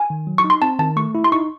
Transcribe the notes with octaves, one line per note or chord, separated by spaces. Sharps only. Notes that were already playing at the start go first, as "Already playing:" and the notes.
Already playing: G#5
D#3
F#3
C#6
D#4
C6
C4 A5
D#3 A5
A3 C#6
E4
C6
D#4 C#6